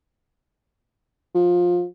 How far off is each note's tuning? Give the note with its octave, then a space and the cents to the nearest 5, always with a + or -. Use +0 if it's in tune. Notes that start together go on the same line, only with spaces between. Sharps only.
F3 +20